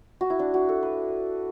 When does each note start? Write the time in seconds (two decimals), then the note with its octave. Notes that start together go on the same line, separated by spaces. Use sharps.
0.21 F#4
0.30 E4
0.39 D4
0.54 F#4
0.69 A4
0.83 B4